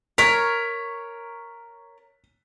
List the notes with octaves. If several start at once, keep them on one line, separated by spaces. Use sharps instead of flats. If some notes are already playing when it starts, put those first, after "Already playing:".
A#4 C#5 B6